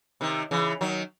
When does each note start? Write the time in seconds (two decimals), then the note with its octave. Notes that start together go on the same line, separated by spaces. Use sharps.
0.21 C3 D#3
0.51 C#3 E3
0.81 D#3 F#3